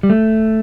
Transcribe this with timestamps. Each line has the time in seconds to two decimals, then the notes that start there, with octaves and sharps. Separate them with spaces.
0.03 G3
0.10 A3